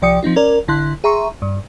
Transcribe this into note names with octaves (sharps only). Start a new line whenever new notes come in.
C2 F3 D5 G5 D#6 C#7
F3 C4 D#4 F4
C#4 A#4 D5
A1 D3 E4 C6 F#6
G#4 E5 A#5 C6 C#6
G2